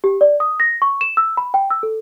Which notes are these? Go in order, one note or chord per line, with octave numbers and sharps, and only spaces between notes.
G4
D5
D#6
A#6
C#6
E7
E6
B5
G5
E6
A4